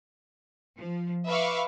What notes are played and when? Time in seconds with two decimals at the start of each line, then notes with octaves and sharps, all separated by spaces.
0.78 F3
1.27 B4 E5 F5 C#6 D6